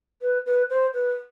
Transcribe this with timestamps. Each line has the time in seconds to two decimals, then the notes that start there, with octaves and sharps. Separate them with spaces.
0.21 B4
0.46 B4
0.70 C5
0.94 B4